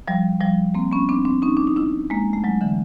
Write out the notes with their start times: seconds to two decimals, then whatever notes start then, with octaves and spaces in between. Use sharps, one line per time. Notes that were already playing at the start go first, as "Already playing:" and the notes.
0.08 F3 G3
0.41 F3 G3
0.75 A#3 C4
0.92 B3 C#4
1.09 C4 D4
1.25 C4 D4
1.42 C#4 D#4
1.57 D4
1.67 D#4
1.76 D4 E4
2.10 G#3 A#3
2.33 A3
2.44 F#3 G#3
2.61 D3 E3